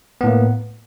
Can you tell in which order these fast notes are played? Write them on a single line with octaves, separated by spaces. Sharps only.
B3 A2 A#3